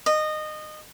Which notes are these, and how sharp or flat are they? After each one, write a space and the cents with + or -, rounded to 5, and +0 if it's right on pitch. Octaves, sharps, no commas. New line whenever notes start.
D#5 -20